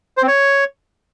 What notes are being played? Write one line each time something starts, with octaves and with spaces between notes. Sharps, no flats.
C5
C4
C#5